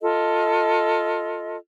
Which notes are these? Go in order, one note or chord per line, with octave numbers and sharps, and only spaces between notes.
F4 A4 D#5